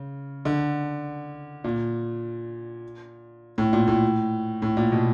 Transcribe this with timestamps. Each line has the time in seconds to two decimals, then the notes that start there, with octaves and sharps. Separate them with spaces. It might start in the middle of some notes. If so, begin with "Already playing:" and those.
Already playing: C#3
0.45 D3
1.64 A#2
3.58 A2
3.73 A#2
3.88 A2
4.62 A2
4.77 A#2
4.92 B2